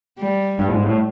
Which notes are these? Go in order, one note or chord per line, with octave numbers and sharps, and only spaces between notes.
G3
G2
A2
G#2
A2